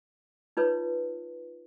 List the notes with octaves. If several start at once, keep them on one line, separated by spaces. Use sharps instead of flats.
D#4 F4 B4 C#5